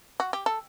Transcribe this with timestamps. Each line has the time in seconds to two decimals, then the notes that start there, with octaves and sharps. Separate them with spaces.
0.20 F#4
0.33 G4
0.46 A4